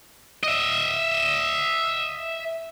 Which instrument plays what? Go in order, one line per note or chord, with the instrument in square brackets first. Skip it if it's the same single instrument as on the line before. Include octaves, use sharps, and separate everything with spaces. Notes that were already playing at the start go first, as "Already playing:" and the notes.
[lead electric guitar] D#5 E5